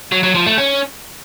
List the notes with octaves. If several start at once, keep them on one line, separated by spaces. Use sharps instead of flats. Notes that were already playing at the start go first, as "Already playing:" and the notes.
F#3
F#3
F3
A3
C#4